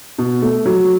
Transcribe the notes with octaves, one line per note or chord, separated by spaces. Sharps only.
B2
A3
F#3